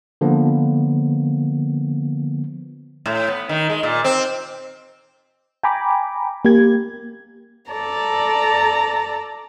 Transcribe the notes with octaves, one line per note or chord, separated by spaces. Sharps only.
D3 F3 A#3 B3
A2
B3
D#3
G#3
A#2
C4
G5 G#5 A#5 B5 D6
A#3 G4 G#6
A4 D5 A5 A#5